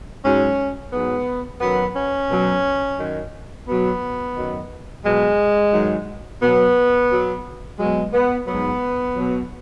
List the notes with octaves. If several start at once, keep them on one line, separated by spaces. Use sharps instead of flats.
G#2 F#3 C#4
G#2 F#3 B3
F#2 D#3 F#3 B3
C#4
B2 F#3
F#2 D#3 F#3
B2 F#3 B3
F#2 D#3 F#3
B2 F#3 G#3
G#2 D#3 F#3
B2 F#3 B3
B2 F#3
B2 F#3 G#3
B3
G#2 F#3 B3
B2 F#3